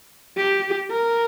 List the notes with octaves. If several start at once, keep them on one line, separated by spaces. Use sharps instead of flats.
G4
A#4